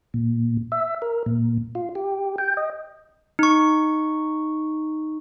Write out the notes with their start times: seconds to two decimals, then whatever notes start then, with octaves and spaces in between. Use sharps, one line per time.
0.14 A#2
0.72 E5
1.02 A#4
1.26 A#2
1.75 F4
1.95 G4
2.38 G5
2.57 D#5
3.39 D#4 C#6